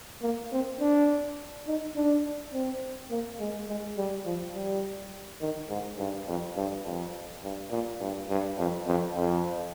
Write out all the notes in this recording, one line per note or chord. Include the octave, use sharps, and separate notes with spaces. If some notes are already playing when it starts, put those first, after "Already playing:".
A#3
C4
D4
D#4
D4
C4
A#3
G#3
G#3
G3
F3
G3
D#3
G#2
G2
F2
G2
F2
G2
A#2
G2
G2
F2
F2
F2